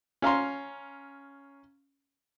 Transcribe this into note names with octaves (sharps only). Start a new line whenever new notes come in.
C#4 F5 A#5 C6